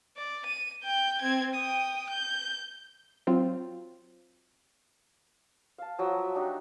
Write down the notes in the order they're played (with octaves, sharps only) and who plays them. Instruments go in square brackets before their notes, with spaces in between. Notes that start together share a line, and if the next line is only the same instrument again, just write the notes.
[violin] D5
D#7
G5 G6
C4 G#6
G5 D#6
G6
[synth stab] F#3 C4 F4
[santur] F5 A5
F3 F#3 D#6
E5
D4 D#4 F#4 G4